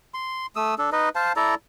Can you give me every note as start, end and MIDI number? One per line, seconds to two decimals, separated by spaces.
0.14 0.46 84
0.56 0.75 57
0.56 0.75 87
0.56 0.75 88
0.78 0.90 62
0.78 0.90 69
0.92 1.09 63
0.92 1.09 71
0.92 1.09 75
1.15 1.32 72
1.15 1.32 77
1.15 1.32 81
1.36 1.55 64
1.36 1.55 69
1.36 1.55 74
1.36 1.55 82